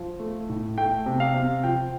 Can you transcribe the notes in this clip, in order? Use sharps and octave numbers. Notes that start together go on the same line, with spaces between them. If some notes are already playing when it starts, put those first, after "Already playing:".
Already playing: F3
A3
A2
A3 G5
C3
F5
C3
F3 G5